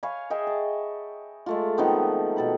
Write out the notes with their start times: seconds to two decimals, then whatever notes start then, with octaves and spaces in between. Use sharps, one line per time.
0.03 C#5 F5 G#5 B5
0.30 G#4 D#5 E5 G5
0.47 A5
1.46 G#3 A3 F4
1.77 D#3 F3 B3 C4
2.36 B2 A4 B5